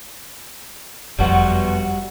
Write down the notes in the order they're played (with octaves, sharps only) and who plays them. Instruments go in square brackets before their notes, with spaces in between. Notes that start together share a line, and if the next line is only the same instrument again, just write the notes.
[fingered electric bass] F#1 F2 [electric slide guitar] G3 F#4 [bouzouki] A3 B3 F4